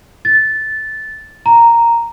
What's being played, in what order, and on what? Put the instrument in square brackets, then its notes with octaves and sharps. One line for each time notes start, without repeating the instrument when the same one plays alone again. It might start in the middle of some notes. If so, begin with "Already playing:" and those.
[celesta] A6
A#5